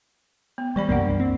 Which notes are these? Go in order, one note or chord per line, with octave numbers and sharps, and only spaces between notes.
B3
E3 G3 D5 B5
C2 F#2 A#3 B3 D4 F#5
C4